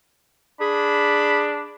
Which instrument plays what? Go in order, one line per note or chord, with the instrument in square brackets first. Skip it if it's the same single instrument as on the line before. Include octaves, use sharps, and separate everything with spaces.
[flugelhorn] D4 [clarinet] G#4 [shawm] B5